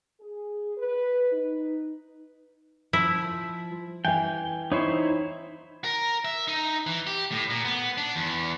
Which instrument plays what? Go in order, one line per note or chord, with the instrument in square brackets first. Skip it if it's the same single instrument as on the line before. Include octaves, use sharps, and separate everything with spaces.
[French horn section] G#4
B4
D#4
[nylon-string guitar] F3 [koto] E4
[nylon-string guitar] E3 F5 [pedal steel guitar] G5 [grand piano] G#5
[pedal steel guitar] D#4 E4 C5 [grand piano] C#5
[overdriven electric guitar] A#4
E5
D#4
E3
G4
A2
A#2
B3
D4
E2